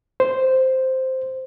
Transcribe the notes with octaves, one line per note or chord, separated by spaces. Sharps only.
C5